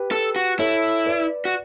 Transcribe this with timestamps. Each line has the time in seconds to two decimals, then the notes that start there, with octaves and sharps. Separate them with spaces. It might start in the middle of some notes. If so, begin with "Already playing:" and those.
Already playing: G4 B4
0.11 A4
0.36 F#4
0.59 E4 A4 C#5
1.06 B4 D5
1.45 F#4